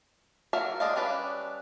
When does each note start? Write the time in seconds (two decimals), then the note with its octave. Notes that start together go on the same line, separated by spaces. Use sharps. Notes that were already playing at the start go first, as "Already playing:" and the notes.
0.53 F#3 A4 A#4 E5 F5
0.80 G#3 D4 D#5 F5
0.96 G3 C#4 D4 B4